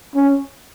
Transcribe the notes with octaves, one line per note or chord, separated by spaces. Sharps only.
C#4